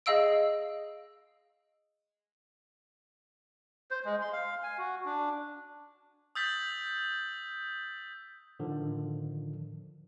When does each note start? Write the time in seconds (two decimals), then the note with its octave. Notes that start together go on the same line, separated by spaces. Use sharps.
0.06 G#4 D#5 F5 E6 D7
3.91 C5
4.05 G#3
4.22 C6
4.33 F5
4.63 G#5
4.78 F#4
5.05 D4
6.35 D#6 E6 G6 A6 B6 F#7
8.59 A2 D3 D#3 F3